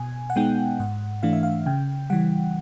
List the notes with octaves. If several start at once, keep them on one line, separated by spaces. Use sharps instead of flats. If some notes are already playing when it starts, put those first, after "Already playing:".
Already playing: B2 G#5
F#5
G#3 B3 D#4 G5
G#2 F#5
E3 A3 D4 F5
E5
F5
C#3 G5
E3 G3 F#5